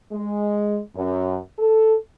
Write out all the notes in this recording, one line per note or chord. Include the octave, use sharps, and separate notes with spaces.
G#3
F#2
A4